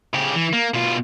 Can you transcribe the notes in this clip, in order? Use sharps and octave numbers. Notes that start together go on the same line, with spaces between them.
C#3 G4
E3
A#3
B2 F4